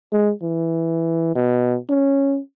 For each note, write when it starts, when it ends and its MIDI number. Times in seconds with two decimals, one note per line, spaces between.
0.12 0.32 56
0.42 1.35 52
1.35 1.77 47
1.90 2.39 61